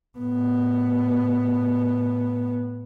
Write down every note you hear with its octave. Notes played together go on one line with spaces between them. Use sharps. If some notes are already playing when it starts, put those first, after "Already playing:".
A2 B3